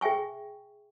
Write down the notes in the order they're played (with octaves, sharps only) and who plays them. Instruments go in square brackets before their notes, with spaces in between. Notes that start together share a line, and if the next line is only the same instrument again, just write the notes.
[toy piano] G#4 E5 G5 G#5 C#6